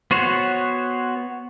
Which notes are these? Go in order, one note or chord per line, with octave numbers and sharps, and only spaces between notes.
B3 F#4 C5 C#5